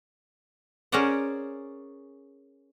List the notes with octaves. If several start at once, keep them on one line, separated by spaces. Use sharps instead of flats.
C#4 G#4 A#4 C5 D5 F#5